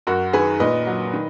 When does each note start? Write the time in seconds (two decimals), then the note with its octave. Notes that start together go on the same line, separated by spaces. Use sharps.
0.07 F#2 F#4 A#4
0.33 D#3 G#4 B4
0.60 A#2 B4 D#5
0.87 F#3
1.13 D#3